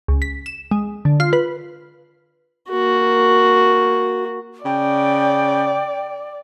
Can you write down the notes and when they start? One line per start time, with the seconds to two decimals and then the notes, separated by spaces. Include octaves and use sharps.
0.08 C#2
0.22 B6
0.46 E7
0.71 G#3
1.05 D3
1.20 F4
1.33 B4
2.69 A#3 F#4
4.65 C#3 D5 G5